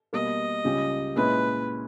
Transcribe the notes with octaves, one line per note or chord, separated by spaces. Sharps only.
B2 G3 A#3 D#5
C#2 C#3 G3 C#4 G4
A#2 G#3 C#4 E4 B4